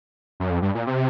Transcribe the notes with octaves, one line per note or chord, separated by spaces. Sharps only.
F#2
F2
G2
A#2
C3